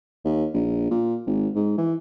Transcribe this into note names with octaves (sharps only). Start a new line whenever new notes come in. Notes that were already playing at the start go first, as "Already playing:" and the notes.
D#2
A#1
A#2
G#1
G#2
E3